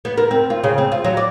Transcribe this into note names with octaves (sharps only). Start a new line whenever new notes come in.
B3
A#4
C4
F4
C#3
C4
F4
F#3
D5